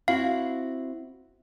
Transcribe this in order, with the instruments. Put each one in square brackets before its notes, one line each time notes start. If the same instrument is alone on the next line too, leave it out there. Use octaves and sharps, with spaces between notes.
[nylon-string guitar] C4 E4 F#4 [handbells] F5